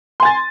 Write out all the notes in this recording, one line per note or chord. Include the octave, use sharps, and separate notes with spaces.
G#5 C6 A6